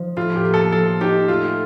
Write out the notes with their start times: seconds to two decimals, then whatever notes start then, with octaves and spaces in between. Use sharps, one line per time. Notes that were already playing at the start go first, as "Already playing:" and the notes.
Already playing: F3 D#4
0.16 A2 F4
0.36 G4
0.45 A#3
0.54 A4
0.72 F3 A4
1.01 D#4 G4
1.28 A3 F4